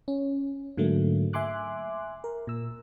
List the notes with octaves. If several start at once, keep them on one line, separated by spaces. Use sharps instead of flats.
C#4
G#2 D3 F#3 A3 A#3
E5 G#5 C6 D6 F#6
A#4
A#2 E6